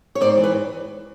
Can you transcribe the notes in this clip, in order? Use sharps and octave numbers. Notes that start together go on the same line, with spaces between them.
C#5
G#2 C5 D5
E3
B4 C#5